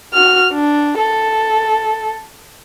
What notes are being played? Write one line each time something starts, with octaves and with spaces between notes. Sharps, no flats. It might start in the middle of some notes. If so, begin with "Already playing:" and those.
F#4 F6
D4
A4